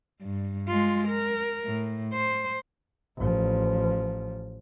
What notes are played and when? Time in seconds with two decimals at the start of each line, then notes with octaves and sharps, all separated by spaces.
0.21 G2
0.68 G#3 F4
1.08 A#4
1.65 A2
2.13 C5
3.18 A1 F3